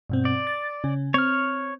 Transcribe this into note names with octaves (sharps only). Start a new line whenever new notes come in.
G2 B2 C4
D5
A6
C#3 C#4
C4 C#5 F6